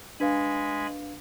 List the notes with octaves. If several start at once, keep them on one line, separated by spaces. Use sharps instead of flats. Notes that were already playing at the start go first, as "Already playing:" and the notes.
G#3 D4 B4 F5 G#5 B5